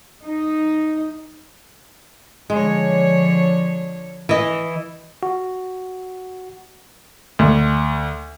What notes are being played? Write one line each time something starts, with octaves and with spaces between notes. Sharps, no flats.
D#4
D3 F3 G#3 C#5
E3 D#5
F#4
D2